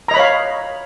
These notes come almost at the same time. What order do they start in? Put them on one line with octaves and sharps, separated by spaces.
A#5 D#5 B5 C#5 F5